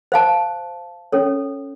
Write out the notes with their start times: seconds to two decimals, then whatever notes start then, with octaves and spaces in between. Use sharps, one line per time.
0.12 C5 F5 A5
1.12 C#4 A4 C#5